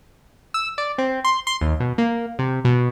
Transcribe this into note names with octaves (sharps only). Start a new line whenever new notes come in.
E6
D5
C4
C6
C6
D#2
B2
A#3
C3
B2